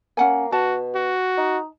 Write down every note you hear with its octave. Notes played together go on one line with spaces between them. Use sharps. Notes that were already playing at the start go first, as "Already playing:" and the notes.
A#3 C#4 F#5 G#5
B2 F#4 A5
F#4
D#4